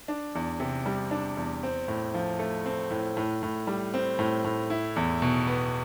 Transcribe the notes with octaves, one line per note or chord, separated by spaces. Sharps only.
D4
E2
C3
G3
D4
E2
C4
A2
F3
A3
C4
A2
A2
A2
G3
C4
A2
A2
E4
E2
B2
B3